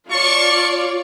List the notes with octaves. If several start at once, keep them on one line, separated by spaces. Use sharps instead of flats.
F4 C#5 D5 A5 C#6